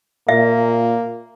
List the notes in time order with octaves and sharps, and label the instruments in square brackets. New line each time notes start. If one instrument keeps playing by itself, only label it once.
[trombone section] A#2 [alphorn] A#3 [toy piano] E5